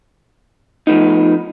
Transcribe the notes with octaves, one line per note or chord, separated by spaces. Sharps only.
F3 A3 B3 D#4